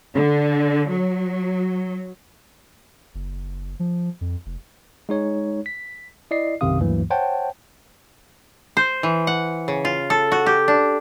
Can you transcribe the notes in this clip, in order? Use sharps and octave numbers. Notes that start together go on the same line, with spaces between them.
D3
F#3
F#1
F3
F2
F1
G#3 D#4 C#5
B6
E4 D5 D#5 C7
B1 F#2 C3 D#3 F5 D#6
D2 G2 E3 F#3 A#3
C5 C#5 F#5 G5 A5
C5
E3
F#5
C#3
F4
A4
F#4
G4
D4